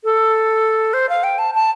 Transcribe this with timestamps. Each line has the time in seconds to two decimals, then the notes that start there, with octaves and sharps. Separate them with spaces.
0.04 A4
0.94 C5
1.09 F5
1.24 G5
1.39 A5
1.55 A5